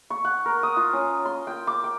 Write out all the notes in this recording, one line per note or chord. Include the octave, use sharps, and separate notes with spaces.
C#6
F#5
A#4
D#6
F4
C#4
C6
G5
D6
G5